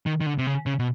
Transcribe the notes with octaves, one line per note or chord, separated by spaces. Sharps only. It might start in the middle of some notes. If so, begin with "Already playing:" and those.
D#3
D#3
D3
C3
C#3
C#3
B2